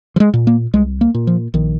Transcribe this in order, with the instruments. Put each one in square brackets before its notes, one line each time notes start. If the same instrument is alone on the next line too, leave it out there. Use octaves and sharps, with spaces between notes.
[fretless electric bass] F3
G#3
A#2
A#3
C2 G#3
A#3
A#2
F3
A#1 D#3